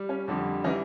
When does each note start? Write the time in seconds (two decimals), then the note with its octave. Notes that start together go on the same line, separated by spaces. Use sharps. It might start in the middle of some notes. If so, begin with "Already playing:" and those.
Already playing: G3
0.09 C#4
0.28 F2 D3 G3
0.64 E3 G3 C#4 D#4